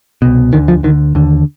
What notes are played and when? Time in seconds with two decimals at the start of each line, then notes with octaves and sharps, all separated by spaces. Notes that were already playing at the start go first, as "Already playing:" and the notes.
0.22 C2 B2
0.53 D2 D3 D#3
0.68 F3
0.83 D2 D3 D#3
1.15 D#2 D3